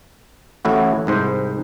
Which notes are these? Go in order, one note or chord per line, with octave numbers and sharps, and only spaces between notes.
A1 A2 E4 F#4
C2 G#2 C5